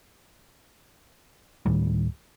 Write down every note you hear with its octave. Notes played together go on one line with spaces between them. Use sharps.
D2 A2 D#3 G3